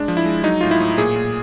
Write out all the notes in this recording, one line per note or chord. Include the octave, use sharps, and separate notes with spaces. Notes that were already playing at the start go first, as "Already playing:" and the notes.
Already playing: G#3 D4
F3
E4
G#3
F#3 D#4
A2 F4
E4
A2
A#2 G#4
A#2